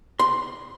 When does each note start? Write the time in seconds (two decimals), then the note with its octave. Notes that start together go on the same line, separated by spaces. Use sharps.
0.19 C6